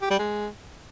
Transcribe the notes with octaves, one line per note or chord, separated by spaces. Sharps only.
G4
G3
G#3